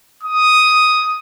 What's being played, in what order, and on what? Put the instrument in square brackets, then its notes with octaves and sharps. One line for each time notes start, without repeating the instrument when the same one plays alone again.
[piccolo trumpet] D#6